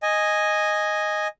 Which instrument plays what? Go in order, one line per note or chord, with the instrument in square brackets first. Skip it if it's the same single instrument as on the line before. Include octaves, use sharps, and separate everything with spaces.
[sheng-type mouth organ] D#5 G#5